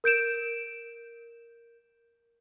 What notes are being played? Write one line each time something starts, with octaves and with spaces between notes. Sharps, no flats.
A#4 G6 D7 E7